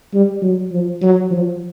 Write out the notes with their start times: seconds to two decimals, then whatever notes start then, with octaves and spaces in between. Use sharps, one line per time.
0.14 G3
0.42 F#3
0.72 F3
1.02 F#3
1.31 F3